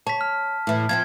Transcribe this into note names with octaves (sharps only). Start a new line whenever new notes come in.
C#5 A5 B6
F6
A2 E3
F3 C4 F4 G#6